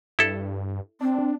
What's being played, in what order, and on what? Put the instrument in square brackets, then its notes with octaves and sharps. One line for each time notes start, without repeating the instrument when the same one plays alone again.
[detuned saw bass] G2 [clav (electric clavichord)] E4 A4
[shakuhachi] C4 [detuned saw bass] D4